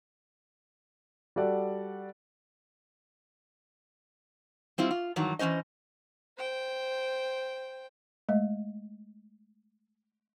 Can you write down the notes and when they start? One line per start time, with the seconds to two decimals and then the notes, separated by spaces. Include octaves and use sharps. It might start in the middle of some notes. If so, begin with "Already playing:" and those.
1.36 G3 F#4 A4 D5 F#5
4.78 G3 C4 E4 F4
4.91 F4
5.16 G2 D#3 E3 F#3
5.39 E3 A3 C#4 C5 D#5
6.37 C5 G5
8.29 G#3 A3 D#5